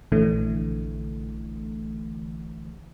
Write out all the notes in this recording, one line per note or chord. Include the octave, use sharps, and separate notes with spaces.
A#1 D3 E3 A3